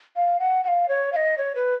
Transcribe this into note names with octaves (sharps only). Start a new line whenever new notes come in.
F5
F#5
F#5
F5
C#5
F5
D#5
C#5
B4